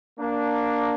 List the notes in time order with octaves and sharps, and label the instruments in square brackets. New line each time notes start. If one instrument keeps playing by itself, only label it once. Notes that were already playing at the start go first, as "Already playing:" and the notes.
[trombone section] A#3 D4